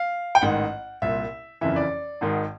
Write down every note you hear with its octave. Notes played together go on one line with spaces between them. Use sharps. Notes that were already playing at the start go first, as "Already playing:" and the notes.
Already playing: F5
G5
A1 G#2 D#3 F#5
C2 A#2 E5
F#1 F2 C#3 E3 E5
D5
G#1 G#2 D#3